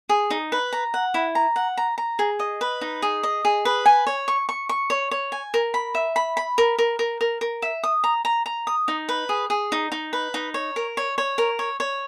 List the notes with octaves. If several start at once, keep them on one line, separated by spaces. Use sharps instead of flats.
G#4
D#4
B4
A#5
F#5
E4
A#5
F#5
A#5
A#5
G#4
D#5
B4
D#4
G#4
D#5
G#4
B4
G#5
C#5
C#6
C#6
C#6
C#5
C#5
G#5
A#4
B5
E5
B5
B5
A#4
A#4
A#4
A#4
A#4
E5
D#6
A#5
A#5
A#5
D#6
D#4
B4
G#4
G#4
D#4
D#4
B4
D#4
C#5
A#4
C#5
C#5
A#4
C#5
C#5